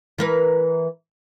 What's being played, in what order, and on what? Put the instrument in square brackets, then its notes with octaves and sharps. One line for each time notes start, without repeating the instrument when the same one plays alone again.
[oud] E3 A#4 B4